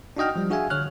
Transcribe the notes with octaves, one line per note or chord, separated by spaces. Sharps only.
D4 D#4 F#4 D#5 G5 F6
F3 G3
D4 F#4 G#4 E5 F5 G#5
D3 C#5 F6 F#6